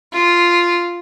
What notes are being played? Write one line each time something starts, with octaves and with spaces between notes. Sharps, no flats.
F4